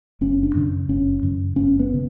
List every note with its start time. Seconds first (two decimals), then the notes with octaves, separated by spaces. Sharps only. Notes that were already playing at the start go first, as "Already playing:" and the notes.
0.21 F#1 C#4
0.43 D4
0.55 F#2 C#3
0.89 F#1 C#4
1.23 F#2 C#3
1.56 F#1 C#4
1.79 B3
1.94 C#3